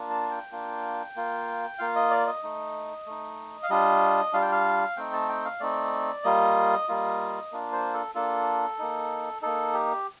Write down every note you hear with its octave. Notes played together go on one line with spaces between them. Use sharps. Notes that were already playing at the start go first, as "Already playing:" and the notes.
Already playing: A#3 D4 F4
A5
G5
A#3 D4 F4
A#3 F4
A#3 F4 F5
D#5
D5
D#5
A3 D#4
A3 D#4
F5
G3 D4 F4 D#5
G3 D4 F4 F5
G5
F5
A3 C4 D#4 G5
A5
G5
F5
A3 C4 D#4 D5
G3 A#3 F4 D#5
G3 A#3 F4
A#3 D4 F4
C5
A4
A#3 D4 F4 A4
A#3 D#4
A#3 D#4 A4
G4